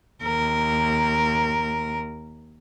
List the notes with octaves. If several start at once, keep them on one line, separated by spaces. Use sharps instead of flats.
D#2 A#4